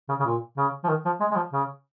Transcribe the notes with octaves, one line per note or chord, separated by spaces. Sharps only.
C#3
C#3
A#2
C#3
F3
D#3
F3
G#3
G#3
F3
C#3